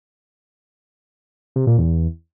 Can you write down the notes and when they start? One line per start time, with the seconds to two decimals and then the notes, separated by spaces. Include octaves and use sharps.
1.56 C3
1.67 A#2
1.78 E2